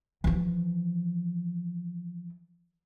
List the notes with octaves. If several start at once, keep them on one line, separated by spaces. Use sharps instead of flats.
E3 F3